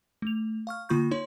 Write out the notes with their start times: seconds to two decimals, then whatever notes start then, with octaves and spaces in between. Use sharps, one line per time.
0.22 A3 F7
0.67 F5 C#6 F6
0.89 D3 A#3 F4 B5 C#6 G6
1.11 D#4 C#5 C6